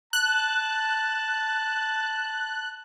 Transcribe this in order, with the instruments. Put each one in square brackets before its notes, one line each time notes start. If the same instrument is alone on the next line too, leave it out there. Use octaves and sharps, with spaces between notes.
[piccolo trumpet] A5 [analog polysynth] F#6